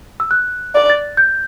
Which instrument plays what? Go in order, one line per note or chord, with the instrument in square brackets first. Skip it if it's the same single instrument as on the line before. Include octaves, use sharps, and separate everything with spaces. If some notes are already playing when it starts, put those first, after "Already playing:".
[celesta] E6
F#6
[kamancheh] D5
[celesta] A6
G6